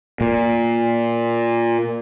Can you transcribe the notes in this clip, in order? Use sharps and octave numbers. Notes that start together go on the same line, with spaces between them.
A#2